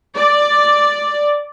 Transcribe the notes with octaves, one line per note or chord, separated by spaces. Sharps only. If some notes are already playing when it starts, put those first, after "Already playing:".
D5